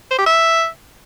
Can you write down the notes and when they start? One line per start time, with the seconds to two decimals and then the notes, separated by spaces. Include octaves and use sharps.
0.11 C5
0.19 G4
0.26 E5